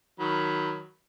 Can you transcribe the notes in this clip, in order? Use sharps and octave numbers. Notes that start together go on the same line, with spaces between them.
D#3 F#3 B5